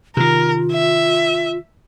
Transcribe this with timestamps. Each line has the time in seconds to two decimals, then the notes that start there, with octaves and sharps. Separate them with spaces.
0.17 C3 D#3 F4 A#4
0.72 E5